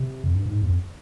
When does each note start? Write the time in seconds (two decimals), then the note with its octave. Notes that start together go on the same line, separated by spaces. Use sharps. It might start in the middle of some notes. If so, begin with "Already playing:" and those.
Already playing: C3
0.24 F2
0.35 G2
0.46 G#2
0.62 E2
0.69 F2